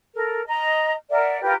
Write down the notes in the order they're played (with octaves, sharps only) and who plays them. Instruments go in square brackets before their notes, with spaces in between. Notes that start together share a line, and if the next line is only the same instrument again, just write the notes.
[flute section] A4 A#4
D#5 A#5
A#4 D5 E5 F#5
F4 G4 A#4 B4